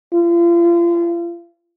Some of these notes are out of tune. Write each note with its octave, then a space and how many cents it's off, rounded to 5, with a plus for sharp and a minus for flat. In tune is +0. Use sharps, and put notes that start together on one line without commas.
F4 -35